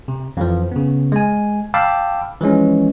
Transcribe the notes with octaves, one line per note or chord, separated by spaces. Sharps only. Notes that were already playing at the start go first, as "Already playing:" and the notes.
C3
F2 E3 F3
C#3 B3
G#3 G#5
F5 G5 A5 B5 D6 E6
E3 F3 G#3 C#4